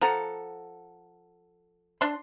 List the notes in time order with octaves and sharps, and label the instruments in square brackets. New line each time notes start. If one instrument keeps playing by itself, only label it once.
[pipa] F3 [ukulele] A4 F#5 A#5
[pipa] D4 C6